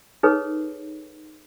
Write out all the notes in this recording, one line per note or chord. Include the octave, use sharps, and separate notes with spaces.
D#4 G#4 A4 B4 C#5